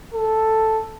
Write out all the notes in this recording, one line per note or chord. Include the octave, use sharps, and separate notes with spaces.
A4